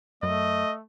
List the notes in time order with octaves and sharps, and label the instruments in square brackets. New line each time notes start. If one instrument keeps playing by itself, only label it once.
[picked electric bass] F#2 [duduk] A3 [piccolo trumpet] D#5